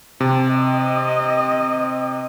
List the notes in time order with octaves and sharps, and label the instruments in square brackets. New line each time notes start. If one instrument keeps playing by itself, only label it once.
[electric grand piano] C3 [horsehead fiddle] A5
[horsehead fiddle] D#5